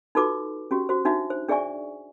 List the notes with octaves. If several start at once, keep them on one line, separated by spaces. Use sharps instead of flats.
D#4 F4 F#4 A4 B4 D6
C#4 F#4 G4
F#4 C5
D4 D#4 F#4 E5
C5
D4 G#4 D5 E5 G#5 C#6